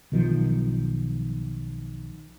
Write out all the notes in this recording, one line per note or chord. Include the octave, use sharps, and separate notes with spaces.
B1 D#3 F3